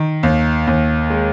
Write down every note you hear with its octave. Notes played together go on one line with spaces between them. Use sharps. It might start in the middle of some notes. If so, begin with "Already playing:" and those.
Already playing: D#3
D#2
D#2
G#3